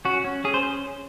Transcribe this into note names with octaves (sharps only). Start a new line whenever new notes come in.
C#4 F#4
C#4
C#4 G#4
C5